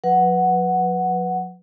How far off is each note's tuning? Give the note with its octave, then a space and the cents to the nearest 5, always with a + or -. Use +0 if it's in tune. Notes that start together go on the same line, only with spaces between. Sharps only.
F#3 -45 B4 +0 F#5 +0